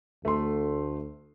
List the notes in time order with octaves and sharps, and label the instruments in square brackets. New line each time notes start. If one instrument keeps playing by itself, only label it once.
[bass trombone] D2 [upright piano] A3 C6